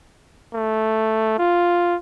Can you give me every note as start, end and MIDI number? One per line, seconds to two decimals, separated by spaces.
0.54 1.38 57
1.38 1.96 65